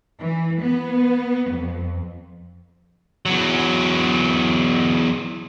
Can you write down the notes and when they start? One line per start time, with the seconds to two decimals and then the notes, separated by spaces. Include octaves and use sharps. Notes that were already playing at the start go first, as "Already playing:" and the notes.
0.20 E3
0.62 B3
1.51 F2
3.26 E2 F#3